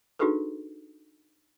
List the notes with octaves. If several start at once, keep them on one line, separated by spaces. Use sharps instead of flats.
D4 D#4 F#4 G#4 A4 B4